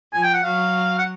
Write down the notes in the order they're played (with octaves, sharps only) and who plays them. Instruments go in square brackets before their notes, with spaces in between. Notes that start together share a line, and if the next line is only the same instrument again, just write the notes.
[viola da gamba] F3 [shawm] G#5
[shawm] G5
F#5
[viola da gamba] F#3 [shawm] F5
[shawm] F#5